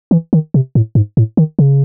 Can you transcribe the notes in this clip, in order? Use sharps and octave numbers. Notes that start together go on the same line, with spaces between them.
E3
D#3
C3
A2
G#2
A2
D#3
C#3